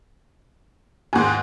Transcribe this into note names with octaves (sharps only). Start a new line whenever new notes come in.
D#2 G#2 G#5 C6